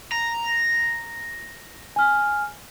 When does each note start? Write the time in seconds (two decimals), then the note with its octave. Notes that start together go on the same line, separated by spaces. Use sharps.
0.12 A#5
1.96 G#5 F6